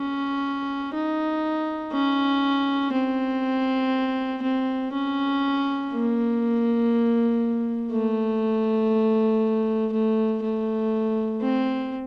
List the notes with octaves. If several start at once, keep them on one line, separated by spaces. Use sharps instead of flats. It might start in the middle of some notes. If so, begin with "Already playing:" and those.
Already playing: C#4
D#4
C#4
C4
C4
C#4
A#3
A3
A3
A3
C4